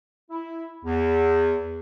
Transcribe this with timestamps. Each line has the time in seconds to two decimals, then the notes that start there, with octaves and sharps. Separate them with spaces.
0.31 E4
0.85 E2